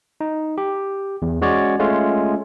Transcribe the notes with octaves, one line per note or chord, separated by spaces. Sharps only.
D#4
G4
E2
G#3 C#4 F#4 C#5 D5
G#3 A3 C#4 F4